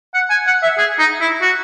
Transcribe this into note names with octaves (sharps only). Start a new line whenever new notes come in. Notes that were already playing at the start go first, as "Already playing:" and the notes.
F#5
G#5
F#5
E5
G#4
D#4
E4
F#4